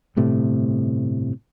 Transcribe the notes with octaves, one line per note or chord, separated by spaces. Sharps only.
G1 A2 C3 A3